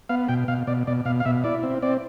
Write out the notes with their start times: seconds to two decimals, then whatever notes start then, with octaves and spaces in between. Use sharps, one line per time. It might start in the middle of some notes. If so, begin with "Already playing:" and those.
0.09 B3 F5
0.28 B2 G5
0.48 B2 F5
0.67 B2 D5
0.87 B2 D5
1.05 B2 F5
1.20 F5
1.25 B2 E5
1.44 E4 D5
1.63 C4
1.82 C4 D5